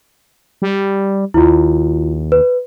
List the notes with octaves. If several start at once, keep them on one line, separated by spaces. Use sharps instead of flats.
G3
D#2 E4 F4
B4